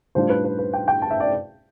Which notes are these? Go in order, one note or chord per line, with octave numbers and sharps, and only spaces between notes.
A2 G3 D4 F4 C5
B4
B4
B4
G5
G5
A5
E5
D5